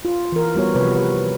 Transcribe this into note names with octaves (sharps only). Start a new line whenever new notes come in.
F4
E3 A#4
G3 B3 F#4 C#5
C3 F3 B4 C#5
B4